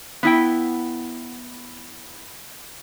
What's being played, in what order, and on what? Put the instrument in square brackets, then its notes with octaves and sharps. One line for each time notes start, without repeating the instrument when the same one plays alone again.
[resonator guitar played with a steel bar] B3 E4 G5